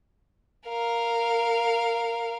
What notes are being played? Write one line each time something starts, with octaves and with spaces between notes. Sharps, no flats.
A#4 F5